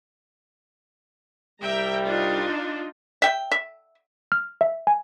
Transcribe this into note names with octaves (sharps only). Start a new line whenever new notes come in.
C2 G3 E5 G5 A#5
D4 D#4 F4
E5 G5
E5
F6
E5
G#5